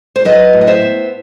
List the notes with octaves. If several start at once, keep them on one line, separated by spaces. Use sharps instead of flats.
C5
F#3 B4 D#5
A2
D#5
C5 E5
B3